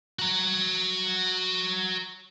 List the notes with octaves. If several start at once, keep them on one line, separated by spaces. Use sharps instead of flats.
F#4 A#5